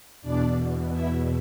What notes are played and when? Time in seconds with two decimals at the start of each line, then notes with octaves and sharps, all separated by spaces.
0.21 E2 B2 D4 D5
0.91 E4 E5